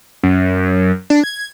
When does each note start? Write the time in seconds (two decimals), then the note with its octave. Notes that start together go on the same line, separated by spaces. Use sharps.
0.23 F#2
1.10 D4
1.24 G#6